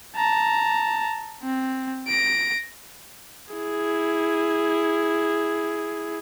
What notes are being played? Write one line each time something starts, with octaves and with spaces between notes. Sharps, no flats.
A5 A#5
C4
A#6 D7
E4 G#4